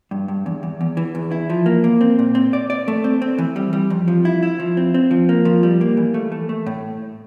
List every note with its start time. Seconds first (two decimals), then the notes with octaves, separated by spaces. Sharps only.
0.11 G2
0.28 G2
0.46 E2
0.63 E2
0.81 E2
0.97 E3
1.15 E2
1.31 E4
1.50 F3
1.66 A#3
1.84 A#3
2.01 C4
2.19 A#2
2.35 C4
2.53 D5
2.70 D5
2.88 A3
3.04 C4
3.22 C4
3.38 E3
3.56 G3
3.73 G3
3.90 F2
4.08 F3
4.25 E4
4.43 E4
4.60 F3
4.77 C4
4.94 C4
5.11 F3
5.29 A#3
5.45 F3
5.63 G3
5.81 A#3
5.97 E3
6.14 A3
6.32 A3
6.49 A3
6.66 A2